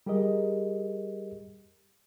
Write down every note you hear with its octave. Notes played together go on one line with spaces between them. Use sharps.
G3 G4 G#4 A#4 D#5